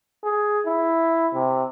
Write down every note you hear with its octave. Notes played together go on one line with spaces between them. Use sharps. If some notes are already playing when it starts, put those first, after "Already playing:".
G#4
E4
C3